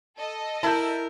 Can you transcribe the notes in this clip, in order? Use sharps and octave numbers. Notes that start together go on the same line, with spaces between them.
A4 D#5
E4 A#4 A5 G6